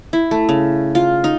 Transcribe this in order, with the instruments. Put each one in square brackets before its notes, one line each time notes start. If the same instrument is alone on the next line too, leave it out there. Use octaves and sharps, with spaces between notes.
[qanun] E4
A3
C#3
F4
D#4